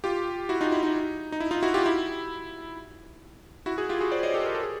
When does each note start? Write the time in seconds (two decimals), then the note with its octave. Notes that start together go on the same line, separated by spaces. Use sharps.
0.04 F4 G4
0.49 E4 F#4
0.61 D#4 F4
0.72 E4
0.83 D#4
1.32 D#4
1.40 E4
1.51 D#4 F4
1.63 E4 F#4
1.74 F4 G4
1.86 E4
3.66 E4 F#4
3.78 F#4 G#4
3.89 F4 G4
4.00 F#4 G#4
4.12 C5 D5
4.23 C#5 D#5
4.34 G4 A4
4.45 A#4
4.55 A4
4.63 G#4